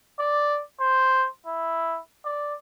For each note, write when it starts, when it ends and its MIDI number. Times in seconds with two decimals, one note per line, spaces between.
0.20 0.60 74
0.80 1.27 72
1.47 1.99 64
2.25 2.54 74